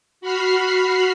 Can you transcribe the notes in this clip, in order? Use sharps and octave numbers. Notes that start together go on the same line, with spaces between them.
F#4 B5 F6 C7